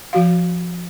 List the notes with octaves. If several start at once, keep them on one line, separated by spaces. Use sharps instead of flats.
F3 F#4 F5